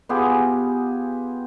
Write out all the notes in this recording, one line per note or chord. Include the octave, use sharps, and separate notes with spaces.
B3 F4 G4 G#4